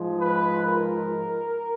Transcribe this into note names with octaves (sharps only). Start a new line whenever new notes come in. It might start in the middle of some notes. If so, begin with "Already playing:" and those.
Already playing: G#2 F3 G#3
B4
A#4